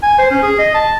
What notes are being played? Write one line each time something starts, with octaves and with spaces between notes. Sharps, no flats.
G#5
C5
C#4
G#4
D#5
A5